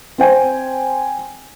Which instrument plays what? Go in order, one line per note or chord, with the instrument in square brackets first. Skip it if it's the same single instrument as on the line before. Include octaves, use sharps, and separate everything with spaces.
[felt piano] C4 C5 G5 G#5